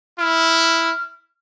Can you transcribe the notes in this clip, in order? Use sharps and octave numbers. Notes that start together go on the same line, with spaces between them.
E4 F6